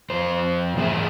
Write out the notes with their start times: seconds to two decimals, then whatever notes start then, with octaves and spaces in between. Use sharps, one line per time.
0.10 F2 C5
0.77 G#2 E3 A3 B3 G#4 E5